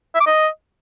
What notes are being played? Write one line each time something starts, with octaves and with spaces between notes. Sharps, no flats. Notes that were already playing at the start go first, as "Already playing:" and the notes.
E5
D6
D#5